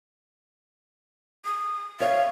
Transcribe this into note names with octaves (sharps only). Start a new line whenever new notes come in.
D#6
C#5 E5 F5